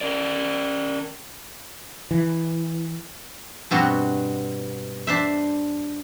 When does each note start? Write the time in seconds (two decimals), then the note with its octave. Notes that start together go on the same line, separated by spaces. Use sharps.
0.01 C#4 A#4 D5
2.11 E3
3.71 G2 B2 C4 F#4
5.07 D4 C5 E5